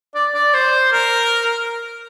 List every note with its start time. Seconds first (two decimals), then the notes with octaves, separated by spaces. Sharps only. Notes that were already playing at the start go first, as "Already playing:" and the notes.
0.15 D5
0.35 D5
0.54 C5
0.92 A#4